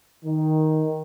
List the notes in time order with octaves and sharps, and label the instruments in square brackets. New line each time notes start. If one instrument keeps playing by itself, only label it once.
[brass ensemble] D#3